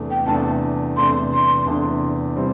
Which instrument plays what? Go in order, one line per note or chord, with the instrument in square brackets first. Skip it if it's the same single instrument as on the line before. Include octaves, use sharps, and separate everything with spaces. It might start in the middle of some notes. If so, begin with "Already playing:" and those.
Already playing: [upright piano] E2 C3 A3 D4
[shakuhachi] G5
[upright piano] E2 C3 A3 D4 [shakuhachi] A5
[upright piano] E2 C3 A3 D4 [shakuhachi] C6
[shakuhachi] C6
[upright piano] E2 C3 A3 D4
C3 G3 C4 E4